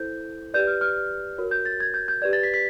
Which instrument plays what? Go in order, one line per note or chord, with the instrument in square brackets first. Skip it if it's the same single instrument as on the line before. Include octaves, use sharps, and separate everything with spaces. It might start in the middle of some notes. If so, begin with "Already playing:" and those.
Already playing: [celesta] E4 A4 C5 G6
G4 B4 D5 G6
F6
F6
F#4 A#4 C#5
G6
A6
G#6
G6
G6
G4 B4 D5 G#6
A6
B6
B6